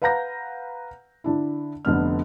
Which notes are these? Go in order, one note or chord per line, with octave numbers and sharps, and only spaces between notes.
B4 F5 F#5 A#5 G6 A#6
D3 D4 E4
F1 D3 B3 F6